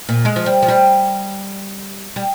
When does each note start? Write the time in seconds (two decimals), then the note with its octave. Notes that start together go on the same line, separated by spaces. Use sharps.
0.09 A#2
0.25 G#3
0.36 F3
0.46 G3
0.62 F3
0.68 G3
2.16 G3